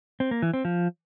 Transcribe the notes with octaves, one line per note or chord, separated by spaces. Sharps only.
C4
A#3
E3
C4
F3